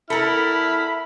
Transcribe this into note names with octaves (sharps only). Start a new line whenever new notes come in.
E4 A4 A#4 B5 F6